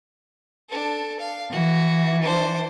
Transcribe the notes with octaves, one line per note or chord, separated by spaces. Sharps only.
D4 A4
F5
E3 F#4
D4 C5